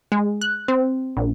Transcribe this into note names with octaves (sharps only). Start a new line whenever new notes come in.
G#3
F#6
C4
A#1